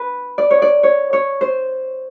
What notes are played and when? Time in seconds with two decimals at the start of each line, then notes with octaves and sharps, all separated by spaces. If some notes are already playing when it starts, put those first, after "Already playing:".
Already playing: B4
0.38 D5
0.51 C#5
0.62 D5
0.83 C#5
1.13 C#5
1.41 C5